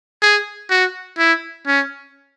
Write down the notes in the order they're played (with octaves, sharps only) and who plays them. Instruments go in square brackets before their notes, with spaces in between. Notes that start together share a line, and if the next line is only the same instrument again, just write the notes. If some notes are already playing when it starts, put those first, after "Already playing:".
[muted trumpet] G#4
F#4
E4
C#4